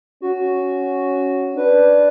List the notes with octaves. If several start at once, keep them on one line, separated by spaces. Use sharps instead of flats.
C#4 F#4
D4 B4